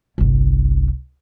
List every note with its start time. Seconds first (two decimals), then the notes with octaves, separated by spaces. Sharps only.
0.18 G1 C2